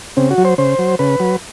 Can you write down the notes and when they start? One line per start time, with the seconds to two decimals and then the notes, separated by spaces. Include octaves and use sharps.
0.17 C#3 C4
0.31 F#4
0.38 F#3
0.45 C5
0.58 C#3 C5
0.79 F#3
0.99 C#3 B4
1.20 F#3